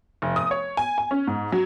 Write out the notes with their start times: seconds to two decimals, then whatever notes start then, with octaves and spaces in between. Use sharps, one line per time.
0.22 F1
0.36 D#6
0.51 C#5
0.77 G#5
0.98 G#5
1.11 C#4
1.27 G#2
1.52 F#3